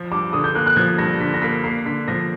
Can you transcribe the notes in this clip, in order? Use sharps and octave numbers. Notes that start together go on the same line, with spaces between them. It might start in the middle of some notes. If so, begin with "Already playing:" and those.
Already playing: F3
G2 D6
D3 D#6
G6
A#3 F#6
F#6
F3 G#6
G2 A#6
D3 B6
A#6
A#3 B6
A#3 C7
D3 B6
F3 A#6